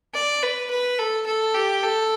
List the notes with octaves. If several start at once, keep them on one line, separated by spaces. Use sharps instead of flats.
D5
B4
B4
A4
A4
G4
A4